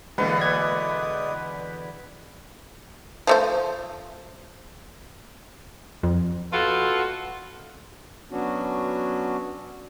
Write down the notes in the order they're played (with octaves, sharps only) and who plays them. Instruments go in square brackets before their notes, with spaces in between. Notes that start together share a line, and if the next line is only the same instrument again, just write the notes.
[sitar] E2 B2 D3 [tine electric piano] G#3 A#3 [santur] B4 [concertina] G#5
[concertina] G#3 D5 D#6 [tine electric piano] G#6
[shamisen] F3 A3 C5
[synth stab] F2
[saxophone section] B2 F4 F#4 A4
[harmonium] F#3 B3 C#4 D4 F#4